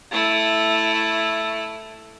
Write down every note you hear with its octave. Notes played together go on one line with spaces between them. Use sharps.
A3 E4